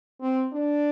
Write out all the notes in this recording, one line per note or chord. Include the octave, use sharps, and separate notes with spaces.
C4
D4